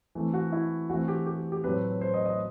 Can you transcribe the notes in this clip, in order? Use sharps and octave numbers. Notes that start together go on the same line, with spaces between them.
E3 A3 C4
F#4
E4
E3 A3 C4 F#4
G4
G4
G4
A2 F#3 A3 C4 B4
C5
D#5
D#5